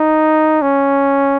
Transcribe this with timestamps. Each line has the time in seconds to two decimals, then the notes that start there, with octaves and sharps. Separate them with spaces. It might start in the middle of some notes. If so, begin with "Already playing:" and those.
Already playing: D#4
0.62 C#4